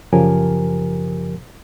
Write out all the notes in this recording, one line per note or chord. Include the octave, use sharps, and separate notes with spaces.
F#2 C#3 F3 G4 A#4 G#5